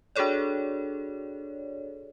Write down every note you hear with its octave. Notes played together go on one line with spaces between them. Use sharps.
D4 F#4 G#4 A4 C#5 D5